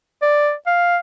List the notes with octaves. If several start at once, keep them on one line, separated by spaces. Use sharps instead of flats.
D5
F5